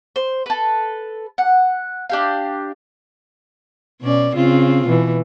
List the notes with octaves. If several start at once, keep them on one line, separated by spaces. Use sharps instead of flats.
C5
A4 B4
F#5
D4 G4 F5
B2 C#4 D5
C#3 C4 F4
B2 E3